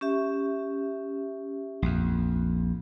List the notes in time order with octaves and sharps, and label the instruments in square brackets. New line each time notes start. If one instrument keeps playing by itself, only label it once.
[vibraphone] C#4 G4 E5
[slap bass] A#1 F2